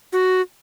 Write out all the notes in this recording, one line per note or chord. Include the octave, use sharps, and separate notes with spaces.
F#4